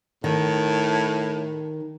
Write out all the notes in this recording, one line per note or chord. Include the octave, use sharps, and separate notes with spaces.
A2 D#3